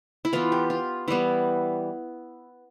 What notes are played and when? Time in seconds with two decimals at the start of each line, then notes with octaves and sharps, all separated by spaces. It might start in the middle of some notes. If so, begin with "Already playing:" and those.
0.25 E4
0.33 E3 B3 F4
0.52 G4
0.70 F4
1.08 E3 G3 B3 E4